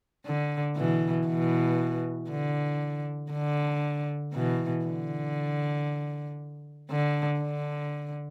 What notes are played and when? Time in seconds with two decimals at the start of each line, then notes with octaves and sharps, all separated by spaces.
0.26 D3
0.76 B2 E3
1.27 B2 E3
2.30 D3
3.32 D3
4.34 B2 E3
4.85 D3
6.90 D3
7.41 D3